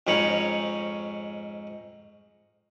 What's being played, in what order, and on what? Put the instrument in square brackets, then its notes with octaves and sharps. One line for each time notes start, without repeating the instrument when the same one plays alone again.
[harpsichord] F2 G#2 C#4 D#4 C#5 B5